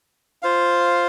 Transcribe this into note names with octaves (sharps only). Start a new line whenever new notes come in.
F4 C5 F5